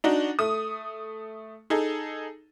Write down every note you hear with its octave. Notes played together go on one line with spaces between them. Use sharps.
D4 D#4 F#4
A3 D#6
D#4 G#4 A4